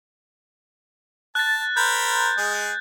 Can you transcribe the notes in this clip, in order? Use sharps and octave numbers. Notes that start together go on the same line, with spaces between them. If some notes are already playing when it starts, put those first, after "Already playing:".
A5 F#6 A6
A#4 C5 B5 G6
G#3 G#4